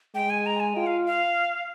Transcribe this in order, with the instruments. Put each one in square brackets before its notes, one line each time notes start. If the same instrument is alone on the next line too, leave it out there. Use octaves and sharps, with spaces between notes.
[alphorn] G#3 [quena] G5
[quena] G#5
A#5
G#5
[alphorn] F4 [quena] G5
[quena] F5
F5